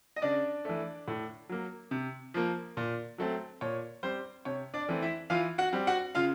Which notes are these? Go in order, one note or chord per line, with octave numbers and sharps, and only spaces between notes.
D#5
C#3 D4 D5
E3 A3
A2
F#3 A#3
C3
F3 A#3
A#2
F#3 A3 C4
A#2 C#5
G3 C4 C5
C3 C#5
D4 D5
E3 A3 C4
E4 E5
E3 F4 F5
F#4 F#5
G3 C4
F#4 F#5
C#3 F4 F5